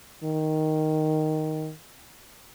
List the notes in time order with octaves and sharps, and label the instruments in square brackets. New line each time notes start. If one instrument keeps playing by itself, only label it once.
[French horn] D#3